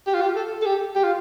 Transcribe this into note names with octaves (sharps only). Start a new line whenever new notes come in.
G4
F4
G4
A4
A4
G4
G4
F4